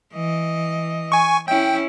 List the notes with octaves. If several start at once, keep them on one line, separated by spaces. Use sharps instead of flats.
E3 D#5
G#5 C#6
C#4 E4 G5